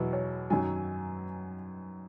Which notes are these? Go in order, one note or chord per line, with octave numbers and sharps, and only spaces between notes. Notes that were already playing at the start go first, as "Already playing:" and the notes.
Already playing: E2 B2 F#3 E4
C#5
F#2 D#3 F#3 G#5